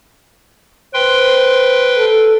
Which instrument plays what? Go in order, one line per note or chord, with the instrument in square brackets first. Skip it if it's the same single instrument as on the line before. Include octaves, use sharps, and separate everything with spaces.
[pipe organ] B4 G5 C6 [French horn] C5
[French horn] A4